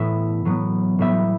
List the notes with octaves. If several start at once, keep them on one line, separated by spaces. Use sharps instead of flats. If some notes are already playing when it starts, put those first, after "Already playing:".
Already playing: A2 E3 B3 E5
A2 F#3 B3
A2 G3 B3 E5